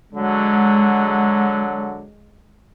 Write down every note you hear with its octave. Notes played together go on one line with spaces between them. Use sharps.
D3 F#3 G#3